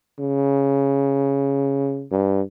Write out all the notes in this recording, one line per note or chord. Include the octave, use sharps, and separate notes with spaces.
C#3
G2